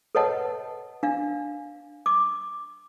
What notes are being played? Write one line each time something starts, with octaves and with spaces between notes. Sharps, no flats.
A4 B4 C#5 D#5 F#5 A5
D4 F5
D6